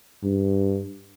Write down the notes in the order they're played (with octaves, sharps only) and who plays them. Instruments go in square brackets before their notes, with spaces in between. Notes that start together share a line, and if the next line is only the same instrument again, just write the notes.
[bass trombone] G2